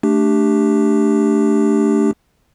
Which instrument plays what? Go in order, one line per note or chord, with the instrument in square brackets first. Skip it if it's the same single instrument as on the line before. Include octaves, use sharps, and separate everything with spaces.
[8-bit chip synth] A3 D4 G4